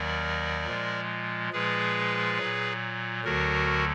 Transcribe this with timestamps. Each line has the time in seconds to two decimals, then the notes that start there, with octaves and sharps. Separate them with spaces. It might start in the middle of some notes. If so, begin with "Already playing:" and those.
Already playing: D#2 D#3 F#3 A#4 D5
0.66 A#2 F3 G#3
1.52 A#2 F3 G#3 G#4 B4
2.39 A#2 F#3
3.24 D2 D3 F#3 F#4 A#4